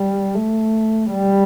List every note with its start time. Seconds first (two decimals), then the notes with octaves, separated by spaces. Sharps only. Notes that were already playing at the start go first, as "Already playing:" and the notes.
Already playing: G3
0.35 A3
1.11 G3